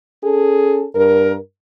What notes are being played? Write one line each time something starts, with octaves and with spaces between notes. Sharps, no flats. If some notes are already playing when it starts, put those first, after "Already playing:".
C#4 G#4 A4
G2 A#4